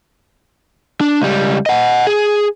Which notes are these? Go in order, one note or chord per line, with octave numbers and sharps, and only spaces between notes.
D4
C#2 G3
D#5 F#5
G#4